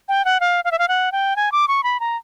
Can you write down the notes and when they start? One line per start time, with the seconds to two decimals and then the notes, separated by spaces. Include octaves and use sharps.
0.09 G5
0.25 F#5
0.40 F5
0.65 F5
0.72 E5
0.79 F5
0.88 F#5
1.12 G5
1.36 G#5
1.52 D6
1.68 C#6
1.84 B5
2.00 A#5